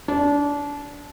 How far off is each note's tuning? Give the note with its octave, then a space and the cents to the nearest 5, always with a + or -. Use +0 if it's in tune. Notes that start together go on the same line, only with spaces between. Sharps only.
D4 -25